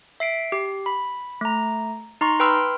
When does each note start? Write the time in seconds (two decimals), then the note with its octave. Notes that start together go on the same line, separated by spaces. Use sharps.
0.20 E5 C7 D7
0.52 G4
0.86 B5
1.41 A3 A#5
2.21 D#4 A#5 C6 C#6
2.40 B4 G5 B5 C6 E6 F6